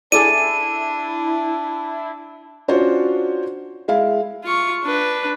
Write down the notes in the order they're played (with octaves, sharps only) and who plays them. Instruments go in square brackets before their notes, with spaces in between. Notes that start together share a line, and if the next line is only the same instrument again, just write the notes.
[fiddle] D4 [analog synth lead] E4 [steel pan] G#4 A4 D5 [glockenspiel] D#7
[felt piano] C#4 D4 F4 F#4 C5 C#5
G#3 E4 F5
[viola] F4 C#6
D4 B4